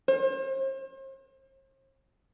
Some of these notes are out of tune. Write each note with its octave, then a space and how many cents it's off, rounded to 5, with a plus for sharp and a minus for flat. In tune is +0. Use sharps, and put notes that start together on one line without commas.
C5 +40